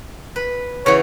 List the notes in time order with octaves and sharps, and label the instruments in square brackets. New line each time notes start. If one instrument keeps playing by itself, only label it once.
[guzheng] B4
[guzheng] C#3 E3 F#4 [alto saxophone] C#5